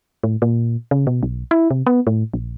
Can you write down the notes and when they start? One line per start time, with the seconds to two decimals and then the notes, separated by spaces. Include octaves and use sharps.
0.23 A2
0.42 A#2
0.91 C#3
1.07 B2
1.23 B1
1.51 E4
1.71 C3
1.87 B3
2.07 A2
2.34 A#1